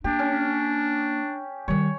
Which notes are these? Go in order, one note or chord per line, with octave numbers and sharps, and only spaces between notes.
A#3 D4 G4
C#4
D#3 G3 C#5